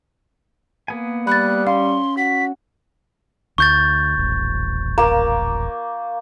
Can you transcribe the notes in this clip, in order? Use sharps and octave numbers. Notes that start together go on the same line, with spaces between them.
A#3 B3 G#5
G3 B5 F#6 A6
C#4 F5 C6
F#4 B6
D2 C#6 G6 A6
D#1 A1
A#3 A#5